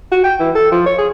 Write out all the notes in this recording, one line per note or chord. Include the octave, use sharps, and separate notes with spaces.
F#4
G5
E3
A4
F3
C#5
G#4